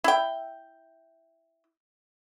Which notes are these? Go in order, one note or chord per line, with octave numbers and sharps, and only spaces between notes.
E4 G5